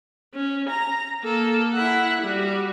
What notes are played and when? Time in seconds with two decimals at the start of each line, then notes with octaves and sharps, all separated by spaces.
0.34 C#4
0.69 A#5
1.24 A#3 A4
1.74 E4 F#5
2.22 G3 F#4